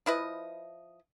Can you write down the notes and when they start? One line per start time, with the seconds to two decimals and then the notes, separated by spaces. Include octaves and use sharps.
0.06 F3 E4 B4 D#5